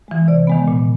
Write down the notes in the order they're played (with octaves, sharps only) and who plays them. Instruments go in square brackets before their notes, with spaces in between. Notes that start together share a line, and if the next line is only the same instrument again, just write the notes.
[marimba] E3 G#3
C3 D5
D#3 G#3 B3
A#2